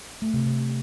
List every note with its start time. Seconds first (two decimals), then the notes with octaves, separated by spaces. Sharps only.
0.22 A3
0.34 C3
0.46 C3